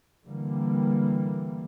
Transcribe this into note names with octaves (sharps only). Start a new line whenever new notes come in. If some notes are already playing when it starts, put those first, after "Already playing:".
D3 E3 G3 A#3